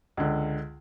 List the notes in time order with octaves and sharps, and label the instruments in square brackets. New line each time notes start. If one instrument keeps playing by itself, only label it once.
[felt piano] C#2 D3